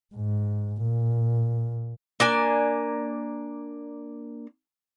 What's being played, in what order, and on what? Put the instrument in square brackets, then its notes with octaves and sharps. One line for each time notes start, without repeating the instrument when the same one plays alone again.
[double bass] G#2
A#2
[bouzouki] A#3 D4 G#5